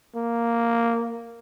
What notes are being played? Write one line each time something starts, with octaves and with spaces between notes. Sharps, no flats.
A#3